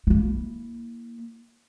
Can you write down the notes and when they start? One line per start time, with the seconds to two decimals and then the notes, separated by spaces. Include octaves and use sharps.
0.07 A#3 E4